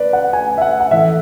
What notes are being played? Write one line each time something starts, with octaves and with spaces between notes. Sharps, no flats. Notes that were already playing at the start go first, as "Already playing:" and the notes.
Already playing: B4 D5
F#5
G#5
E5
F#5
F#5
A2 E3 A3 E5